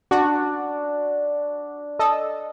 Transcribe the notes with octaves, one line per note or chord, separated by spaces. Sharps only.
D4 F#4
A4 D#5